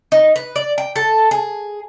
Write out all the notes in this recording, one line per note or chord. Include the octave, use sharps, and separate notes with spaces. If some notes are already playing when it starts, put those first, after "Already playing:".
D#4
B4
D5
G5
A4
G#4